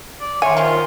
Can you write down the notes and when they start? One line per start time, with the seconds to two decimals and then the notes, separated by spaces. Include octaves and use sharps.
0.20 D5
0.42 D#3 C#5 E5 G#5 C6
0.57 F3 F4